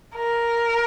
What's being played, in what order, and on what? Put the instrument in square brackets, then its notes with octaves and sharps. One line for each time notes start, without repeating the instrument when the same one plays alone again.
[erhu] A#4